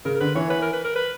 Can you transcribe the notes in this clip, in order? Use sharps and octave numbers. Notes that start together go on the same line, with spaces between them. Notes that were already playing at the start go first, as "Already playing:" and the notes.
C#3 A#4
A#4
D3 B4
E3 C#5
B4
A#4
B4
A#4
B4